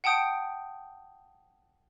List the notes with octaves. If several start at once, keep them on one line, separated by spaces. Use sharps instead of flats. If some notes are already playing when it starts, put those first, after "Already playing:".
F#5 G5 A5 D#6 G6 D7